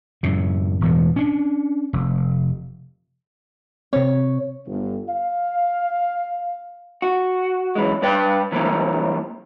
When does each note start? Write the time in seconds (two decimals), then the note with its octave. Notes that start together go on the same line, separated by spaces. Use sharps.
0.23 F#2 A2 C#3
0.81 E1 E2 A2
1.16 C#4 D4
1.93 F1
3.93 C3 C4 C#5
4.66 G1
5.08 F5
7.02 F#4
7.75 F#2 E3 G#3
8.02 G2 B4 D5 G5
8.52 C3 E3 F#3 G3 A#3